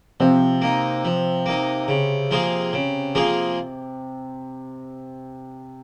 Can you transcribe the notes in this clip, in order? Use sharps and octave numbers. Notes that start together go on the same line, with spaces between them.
C3 F3 C4
A#3 D#4
F3
A#3 D#4
C#3
F3 A#3 F4 G#4
C#3
F3 A#3 F4 G#4